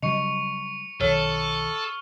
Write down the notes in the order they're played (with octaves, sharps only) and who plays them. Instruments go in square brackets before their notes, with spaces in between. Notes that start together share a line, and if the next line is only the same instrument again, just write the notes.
[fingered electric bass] C#3 F#3 G3 [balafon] D#5 [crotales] C#6 C#7 F7
[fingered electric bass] B1 D#3 [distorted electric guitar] A4 [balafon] C#5 [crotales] F6 F#7